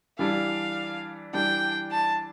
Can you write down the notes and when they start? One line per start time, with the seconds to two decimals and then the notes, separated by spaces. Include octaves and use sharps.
0.19 E3 G3 D4 F5
1.33 E3 G3 D4 G5
1.91 A5